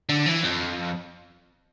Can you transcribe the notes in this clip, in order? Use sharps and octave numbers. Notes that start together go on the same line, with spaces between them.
D3
E3
F2